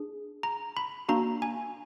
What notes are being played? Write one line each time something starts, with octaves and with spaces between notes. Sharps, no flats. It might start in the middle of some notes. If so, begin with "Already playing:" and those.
Already playing: D4 G#4
A#5
B5
A#3 D4 F#4 A#5
G#5